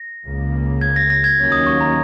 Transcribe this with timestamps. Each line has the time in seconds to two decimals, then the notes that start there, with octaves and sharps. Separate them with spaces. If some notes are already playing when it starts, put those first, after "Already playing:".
Already playing: A#6
0.26 C#2 C#3 A#3
0.81 G#6
0.96 A#6
1.10 A#6
1.24 G#6
1.39 D#2 D#3 F#3 A#3 C#4
1.52 D#6
1.67 C#6
1.81 A#5